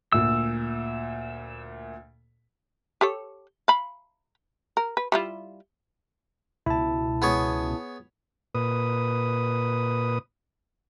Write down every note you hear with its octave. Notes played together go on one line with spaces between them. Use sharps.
D2 A#2 E6
G4 A4 C#5
F5 B5
A#4
B4
G3 E4 F4
C#2 B2 E4 A5
B3 G#4 C#5
A#2 B4 D#6